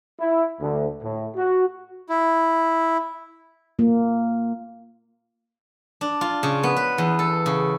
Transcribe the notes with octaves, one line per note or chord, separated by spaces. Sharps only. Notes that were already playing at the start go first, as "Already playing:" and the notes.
E4
D2
A2
F#4
E4
A#3 F4
D4
F4
C#3
B3
B4
E2
A4
C#3